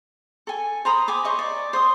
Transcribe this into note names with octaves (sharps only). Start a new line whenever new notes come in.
A4 G#5
C5 A#5 B5 D#6
G#5 B5 D6 D#6
C5 C#5 D#5 C#6
D5
C5 C6 D#6